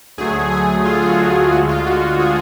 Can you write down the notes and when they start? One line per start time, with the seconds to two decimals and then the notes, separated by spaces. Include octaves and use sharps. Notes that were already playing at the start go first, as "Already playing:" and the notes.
0.18 D2 D3 F#3 A3 G#4
0.51 G#4
0.85 F4
1.03 F4
1.07 F#4
1.52 D2 D3 G#3 F#4
1.69 F4
1.87 F#4
2.19 G#4